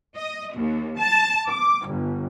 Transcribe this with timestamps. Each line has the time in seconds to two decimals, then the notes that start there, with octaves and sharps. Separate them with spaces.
0.16 D#5
0.56 D#2
0.98 A5
1.49 D6
1.86 G1